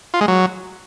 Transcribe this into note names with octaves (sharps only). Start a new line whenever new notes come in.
F4
G#3
F#3